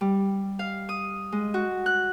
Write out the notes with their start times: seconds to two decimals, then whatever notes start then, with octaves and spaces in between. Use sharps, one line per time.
0.01 G3
0.59 F5
0.89 D#6
1.32 G#3
1.54 F#4
1.86 F#6